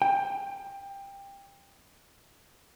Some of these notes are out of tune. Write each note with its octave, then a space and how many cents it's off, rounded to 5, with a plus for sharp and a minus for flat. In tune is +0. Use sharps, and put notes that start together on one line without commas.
G5 +20